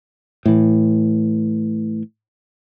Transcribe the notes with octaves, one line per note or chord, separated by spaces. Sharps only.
A2 E3